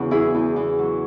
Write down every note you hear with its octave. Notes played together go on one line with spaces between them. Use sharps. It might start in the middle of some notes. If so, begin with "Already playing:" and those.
Already playing: E2 C#3 C#4 F#4
F#3 E4 G#4
E2
E2
F#3